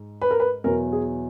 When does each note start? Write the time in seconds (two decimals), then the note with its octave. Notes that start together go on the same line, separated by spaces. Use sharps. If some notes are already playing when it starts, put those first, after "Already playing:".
Already playing: G#2
0.21 B4
0.31 A#4
0.40 B4
0.64 E2 B2 F#3 A#4
0.92 G#4